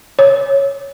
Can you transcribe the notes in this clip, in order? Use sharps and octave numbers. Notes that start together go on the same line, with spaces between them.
C#5